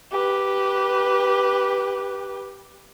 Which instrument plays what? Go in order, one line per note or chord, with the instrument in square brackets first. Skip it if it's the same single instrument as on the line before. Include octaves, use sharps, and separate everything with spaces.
[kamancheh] G4 B4